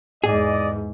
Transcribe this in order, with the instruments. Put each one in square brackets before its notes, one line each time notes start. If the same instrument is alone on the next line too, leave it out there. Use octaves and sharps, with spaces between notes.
[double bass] E2 G#2 [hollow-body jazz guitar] G#4 [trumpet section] D5 D#5